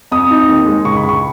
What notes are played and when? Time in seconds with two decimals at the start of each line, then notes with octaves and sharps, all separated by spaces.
0.12 F2 D#6
0.31 D#4
0.48 D#2
0.66 G#3
0.85 C#2 C#6
0.97 B5
1.04 C#2
1.09 C#6